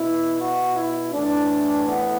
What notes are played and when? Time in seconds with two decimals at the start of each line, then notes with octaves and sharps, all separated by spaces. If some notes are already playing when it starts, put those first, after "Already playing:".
Already playing: B2 E4
0.40 F#4
0.75 E4
1.12 A2 E3 D4
1.86 B3